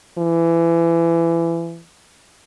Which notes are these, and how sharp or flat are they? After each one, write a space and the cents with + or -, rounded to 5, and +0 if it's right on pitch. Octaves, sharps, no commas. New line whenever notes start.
E3 +25